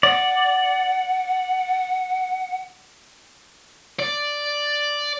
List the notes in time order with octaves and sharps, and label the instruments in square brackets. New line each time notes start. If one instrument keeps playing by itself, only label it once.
[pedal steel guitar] D5 [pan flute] F#5
[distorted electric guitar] D5